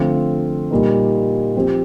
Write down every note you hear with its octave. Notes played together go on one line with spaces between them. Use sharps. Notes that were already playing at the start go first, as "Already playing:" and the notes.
Already playing: D3 F3 A3 C4 F4
A#2 G3 A#3 D#4
F3 C4 G4